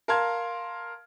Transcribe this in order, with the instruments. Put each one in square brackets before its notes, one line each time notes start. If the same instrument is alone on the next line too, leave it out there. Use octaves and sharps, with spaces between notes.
[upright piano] A#4 F5 A5 C6 F6 G#6